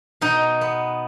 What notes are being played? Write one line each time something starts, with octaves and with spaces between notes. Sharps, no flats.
B2 D#4
B3